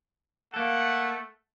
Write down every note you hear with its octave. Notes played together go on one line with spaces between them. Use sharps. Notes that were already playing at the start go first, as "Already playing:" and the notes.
A3 A#3 A4 F#5